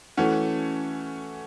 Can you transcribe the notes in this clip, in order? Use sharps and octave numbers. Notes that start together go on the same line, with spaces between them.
E3 A3 C#4 F#4